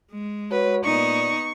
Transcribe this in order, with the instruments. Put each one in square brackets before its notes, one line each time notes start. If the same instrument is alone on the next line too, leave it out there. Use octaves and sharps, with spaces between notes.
[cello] G#3
[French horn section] F#4 C#5 [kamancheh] B4
[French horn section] A#2 D5 [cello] B3 D#4 [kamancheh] C#6